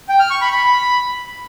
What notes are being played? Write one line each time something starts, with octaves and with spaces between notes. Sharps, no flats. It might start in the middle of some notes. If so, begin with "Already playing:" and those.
G5
F6
C#6
B5
B5